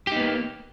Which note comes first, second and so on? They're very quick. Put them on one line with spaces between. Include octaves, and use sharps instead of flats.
G4 D#4 B3 A#3